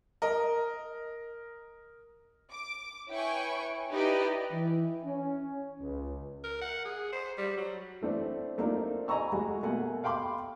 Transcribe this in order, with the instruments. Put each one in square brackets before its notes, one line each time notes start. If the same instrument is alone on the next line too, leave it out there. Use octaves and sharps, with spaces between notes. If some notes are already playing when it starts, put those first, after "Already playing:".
[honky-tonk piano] A#4 D#5
[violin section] D6
E4 B4 C#5 G5 G#5 C#6
D#4 E4 G4 B4 D5 D#5
[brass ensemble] E3
C#4
C#2
[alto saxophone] A#4
F#5
G#4
C5
G3
F#3
[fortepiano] E3 A3 C4 D4
A3 A#3 C4 D4 D#4 F4
D#5 G#5 A#5 B5 C#6 E6
G#3 A3 F#4 G#4
B2 A3 A#3 F#5 G#5
F5 G5 B5 C6 D6